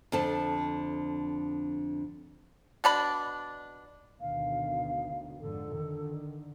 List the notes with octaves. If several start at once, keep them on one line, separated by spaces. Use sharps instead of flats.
F2 D3 A5
B2 D4 B5
D2 B2 D#3 F5
F2 G#2 D3 A4
D3 D#3